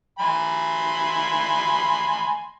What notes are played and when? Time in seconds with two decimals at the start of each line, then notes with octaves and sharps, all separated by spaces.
0.19 G#5 B5 C6